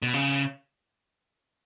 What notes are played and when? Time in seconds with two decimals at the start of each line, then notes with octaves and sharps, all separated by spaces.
0.02 B2
0.14 C#3